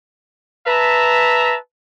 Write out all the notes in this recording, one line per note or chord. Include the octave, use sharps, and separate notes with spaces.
B4 E5 A5 A#5